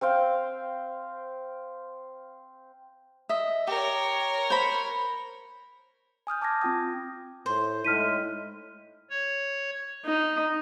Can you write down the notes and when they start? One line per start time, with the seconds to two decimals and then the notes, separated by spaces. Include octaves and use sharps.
0.01 C4 C5 F5 G5
3.29 D#5 E5
3.67 G4 A#4 C#5
4.50 C5 B5
6.27 G#5 D#6 F6 G6
6.41 A5 D6 D#6 G#6 A#6
6.62 C4 F4 G5 D#6
7.46 A2 C5
7.85 A2 G#3 A3 D#4 E4 F6 B6 D#7
9.10 C#5
10.05 D#4